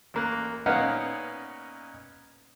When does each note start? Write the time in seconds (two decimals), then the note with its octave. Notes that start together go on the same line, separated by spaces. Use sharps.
0.14 A1 A#3 F#6
0.66 A#2 B3 C#4 D#4 F5 F#5